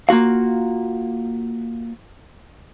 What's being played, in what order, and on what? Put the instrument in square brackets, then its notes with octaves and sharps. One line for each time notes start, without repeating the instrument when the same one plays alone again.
[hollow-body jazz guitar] A#3 F4 F#4 F5